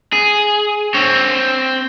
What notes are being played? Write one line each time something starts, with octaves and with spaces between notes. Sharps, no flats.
G#4
C4 C#5